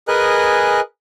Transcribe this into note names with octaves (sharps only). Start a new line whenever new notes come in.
G#4 A#4 B4 D#5 G#5 F#6